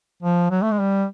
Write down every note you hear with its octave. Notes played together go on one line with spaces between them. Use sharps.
F3
F#3
A3
G#3
G3